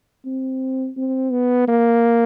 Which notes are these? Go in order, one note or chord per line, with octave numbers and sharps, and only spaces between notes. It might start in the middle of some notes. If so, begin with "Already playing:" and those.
C4
C4
B3
A#3